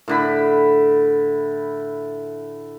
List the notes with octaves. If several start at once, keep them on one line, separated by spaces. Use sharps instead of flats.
A2 D3 B5